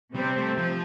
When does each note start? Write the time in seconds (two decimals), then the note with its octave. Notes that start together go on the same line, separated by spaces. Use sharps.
0.15 C3 G3 C4
0.37 A3
0.58 F3